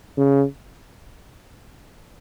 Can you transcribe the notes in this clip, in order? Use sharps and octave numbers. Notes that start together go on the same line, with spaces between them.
C#3